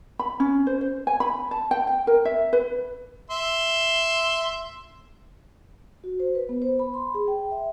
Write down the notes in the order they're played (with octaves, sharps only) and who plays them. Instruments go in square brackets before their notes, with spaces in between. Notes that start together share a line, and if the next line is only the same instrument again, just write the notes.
[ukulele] B5
C#4
C5
C5
G#5
B5
A5
G5
G5
A#4
E5
B4
[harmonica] E5 C6
[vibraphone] F#4
C5
B4
B3
C5
B5
C6
G#4
G5
E5